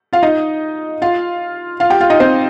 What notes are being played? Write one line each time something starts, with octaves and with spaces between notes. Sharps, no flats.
F4 F5
D#4 D#5
F4 F5
F4 F5
G4 G5
F4 F5
D#4 D#5
C4 C5